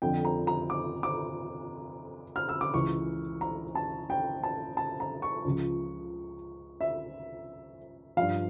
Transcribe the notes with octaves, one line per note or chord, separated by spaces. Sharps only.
F2 D3 F3 G5
A#5
A#5
D6
D6
F6
E6
D6
C#2 C#3 E3 C#6
A#5
A5
G5
A5
A5
A#5
C#6
C#2 C#3 F3
E5
G2 F3 F5